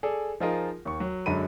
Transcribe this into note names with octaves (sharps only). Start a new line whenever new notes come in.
G#4 A4 D5
F3 D#4 F4 G#4 A#4 D#5
D#2 C#6
F#3
F#2 D3 F#3 G#3 B5 D#7